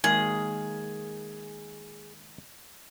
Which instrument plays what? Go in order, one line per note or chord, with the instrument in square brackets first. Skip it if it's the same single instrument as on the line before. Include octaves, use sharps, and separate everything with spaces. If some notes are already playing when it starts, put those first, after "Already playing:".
[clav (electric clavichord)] D#3 G#3 A#3 [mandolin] G#4